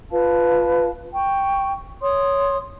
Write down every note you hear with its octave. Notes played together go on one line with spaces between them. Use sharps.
F4 B4 F5 A5
G5 C#6
C#5 C6 D#6